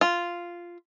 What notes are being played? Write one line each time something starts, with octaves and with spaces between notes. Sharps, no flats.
F4